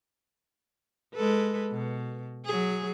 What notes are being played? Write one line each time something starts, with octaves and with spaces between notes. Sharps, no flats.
G#3 A4 B4
B2
F#3 G#4